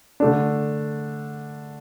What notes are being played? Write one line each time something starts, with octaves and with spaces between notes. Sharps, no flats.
D3 A3 D4